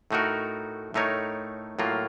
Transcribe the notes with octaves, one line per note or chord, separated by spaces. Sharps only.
A2 A3 D#4 F#4 A#4
A2 A3 D#4 A#4 C#5
A2 F#3 A#3 F4